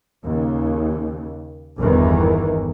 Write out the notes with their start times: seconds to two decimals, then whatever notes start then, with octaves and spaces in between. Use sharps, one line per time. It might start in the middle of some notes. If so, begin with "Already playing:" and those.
0.23 D#2 C#3
1.79 G1 E2 D#3 E3